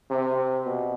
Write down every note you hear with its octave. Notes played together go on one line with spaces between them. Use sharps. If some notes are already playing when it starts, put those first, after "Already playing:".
C3
B2